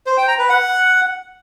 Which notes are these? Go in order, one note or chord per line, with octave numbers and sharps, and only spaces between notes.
C5
G5
A#5
B4
F#5